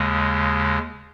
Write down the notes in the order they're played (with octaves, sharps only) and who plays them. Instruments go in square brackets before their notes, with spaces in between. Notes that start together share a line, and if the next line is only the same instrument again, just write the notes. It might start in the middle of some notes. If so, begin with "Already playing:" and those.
Already playing: [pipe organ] D#2 C#3 G#3